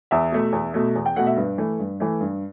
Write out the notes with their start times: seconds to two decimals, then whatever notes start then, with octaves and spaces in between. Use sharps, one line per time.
0.11 E2 E5
0.32 B2 A3
0.52 E2
0.74 B2 A3
0.95 E2
1.06 G5
1.16 B2 A3 F#5
1.26 E5
1.36 G2 B4
1.58 E3 A3
1.79 G2
2.00 E3 A3
2.20 G2